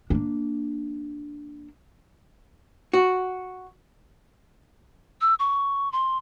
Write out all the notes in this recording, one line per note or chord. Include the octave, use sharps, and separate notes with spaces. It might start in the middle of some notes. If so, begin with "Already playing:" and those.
A#3 D4
F#4
E6
C#6
C6